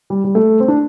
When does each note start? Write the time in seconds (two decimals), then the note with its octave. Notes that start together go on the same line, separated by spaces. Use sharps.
0.10 G3
0.24 G3
0.35 A3
0.60 C4
0.68 D4